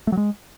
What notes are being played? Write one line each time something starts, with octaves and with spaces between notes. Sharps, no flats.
A3
F#3
G#3